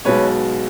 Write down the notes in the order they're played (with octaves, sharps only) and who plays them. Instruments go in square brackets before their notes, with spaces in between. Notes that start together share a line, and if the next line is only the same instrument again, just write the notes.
[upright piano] B1 B2 G#3 B3 B4 C#5